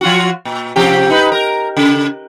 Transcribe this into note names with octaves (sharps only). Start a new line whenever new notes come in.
F3 F4 F#4
A#2
C3 F3 G4
D#4 B4
A#4
C#3